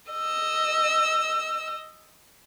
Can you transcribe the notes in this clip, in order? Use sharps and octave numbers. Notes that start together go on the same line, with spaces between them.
D#5 E6